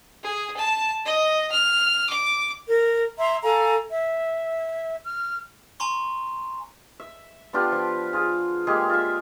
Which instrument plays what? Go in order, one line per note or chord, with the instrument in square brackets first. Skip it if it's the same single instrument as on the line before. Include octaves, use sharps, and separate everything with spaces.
[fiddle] G#4
A5
D#5
F6
D6
[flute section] A#4
E5 A#5 C6
A4 F5 G#5 A#5
E5
F6
[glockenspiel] G#5 A#5 C6 C#6
[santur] E5
B3 D4 F4 G4
F3
F4 G#4
G#3 A#3 G4 G#4
F4 E5